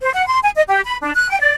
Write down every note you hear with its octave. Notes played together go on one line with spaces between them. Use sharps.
C5
F#5
C6
G#5
D#5
G4
B5
D4
F#6
G5
D5